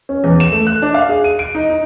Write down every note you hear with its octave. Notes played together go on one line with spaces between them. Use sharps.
C#4
E2
E7
A3
F#6
D4
F5
G#4
D#7
D7
D#4
D#4